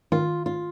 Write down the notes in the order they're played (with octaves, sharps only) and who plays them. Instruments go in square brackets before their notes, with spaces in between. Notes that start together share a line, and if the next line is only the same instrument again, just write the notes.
[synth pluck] D#3 [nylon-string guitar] F4
[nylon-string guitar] F4